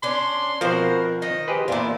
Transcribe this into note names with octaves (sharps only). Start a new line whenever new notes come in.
C#4 D4 C6
B2 F3 C4 F#4 A#4 C5
D#3 D#5
G4 G#4 B4 C5
E2 A#2 D4 E4 F4